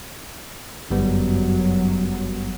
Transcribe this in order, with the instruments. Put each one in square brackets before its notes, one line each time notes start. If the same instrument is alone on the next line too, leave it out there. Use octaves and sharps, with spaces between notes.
[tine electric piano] G1 G3 B3 [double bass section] F#2 F#3